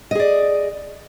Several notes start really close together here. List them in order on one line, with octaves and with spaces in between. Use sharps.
D#5 G#4 D5